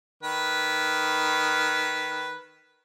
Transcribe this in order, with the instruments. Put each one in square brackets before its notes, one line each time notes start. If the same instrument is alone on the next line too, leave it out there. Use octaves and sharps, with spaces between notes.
[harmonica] D#3 B4